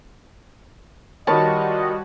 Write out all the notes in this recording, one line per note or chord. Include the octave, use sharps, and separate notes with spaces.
D#3 G3 F4 F#4 B4 C#5 D#5 A5